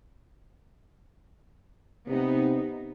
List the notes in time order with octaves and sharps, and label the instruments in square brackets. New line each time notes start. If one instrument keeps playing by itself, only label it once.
[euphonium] C3 [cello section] B3 D#4